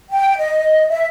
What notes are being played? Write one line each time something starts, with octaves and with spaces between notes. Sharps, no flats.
G5
D#5
E5